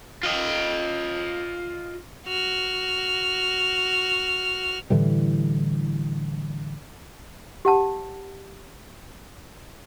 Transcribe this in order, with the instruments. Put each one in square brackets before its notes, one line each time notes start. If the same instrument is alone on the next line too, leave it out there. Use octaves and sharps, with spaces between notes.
[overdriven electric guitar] F4 D#5
[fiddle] F#4 F6
[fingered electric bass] A2 D3 E3 G3
[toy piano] G4 F#5 A5